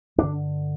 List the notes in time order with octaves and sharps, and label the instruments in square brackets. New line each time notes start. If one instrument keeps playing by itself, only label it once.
[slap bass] G2 D3 D4